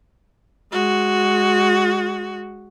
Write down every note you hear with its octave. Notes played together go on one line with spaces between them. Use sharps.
G#3 F#4